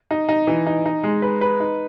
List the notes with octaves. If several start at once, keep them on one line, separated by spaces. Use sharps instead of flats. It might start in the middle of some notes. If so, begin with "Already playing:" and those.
D#4
D#4
E3
D#4
D#4
G#3
B4
B4
D#4